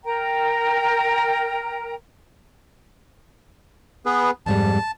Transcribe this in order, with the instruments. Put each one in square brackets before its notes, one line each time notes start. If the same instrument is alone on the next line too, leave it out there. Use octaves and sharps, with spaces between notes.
[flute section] A#4 G5 A#5
[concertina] B3 G#4 B4
[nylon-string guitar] F2 G#2 G3 [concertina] A5